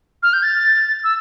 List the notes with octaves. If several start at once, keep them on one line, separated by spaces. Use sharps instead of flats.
F6
G6
A6
E6